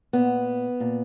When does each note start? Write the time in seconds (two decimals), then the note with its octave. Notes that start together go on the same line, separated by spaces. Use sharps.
0.13 A#2 B3
0.80 A#2